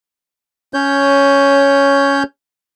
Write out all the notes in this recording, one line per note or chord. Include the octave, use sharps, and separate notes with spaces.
C#4 C#5 G6